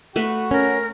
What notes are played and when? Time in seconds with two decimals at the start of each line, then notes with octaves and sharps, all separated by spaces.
0.16 A3 F#4 B4
0.51 C#4 A#4